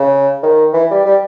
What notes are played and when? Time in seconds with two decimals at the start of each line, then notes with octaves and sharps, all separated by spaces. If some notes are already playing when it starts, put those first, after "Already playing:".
Already playing: C#3
0.43 D#3
0.73 E3
0.90 G3
1.06 G3